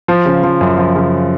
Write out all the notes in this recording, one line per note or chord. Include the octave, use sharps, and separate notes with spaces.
F3
C#3
F3
F#2
F3
C#3